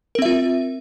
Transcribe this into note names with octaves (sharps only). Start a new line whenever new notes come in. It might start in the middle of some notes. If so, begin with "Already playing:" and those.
C4 F4 A#4 E5